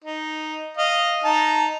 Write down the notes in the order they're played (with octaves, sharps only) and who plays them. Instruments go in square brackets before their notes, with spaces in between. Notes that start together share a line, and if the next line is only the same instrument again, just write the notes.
[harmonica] D#4
D#5 F5
D#4 A5 A#5